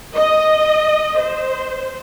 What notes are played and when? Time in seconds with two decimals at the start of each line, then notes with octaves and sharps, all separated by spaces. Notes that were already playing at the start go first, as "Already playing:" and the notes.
0.15 D#5
1.19 C5